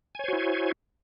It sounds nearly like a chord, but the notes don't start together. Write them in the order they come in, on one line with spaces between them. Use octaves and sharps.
G#5 C#5 C5 F#4 E4